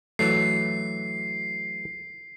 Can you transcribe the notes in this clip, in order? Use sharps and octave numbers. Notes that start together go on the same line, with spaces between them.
E3 F#3 A3 C7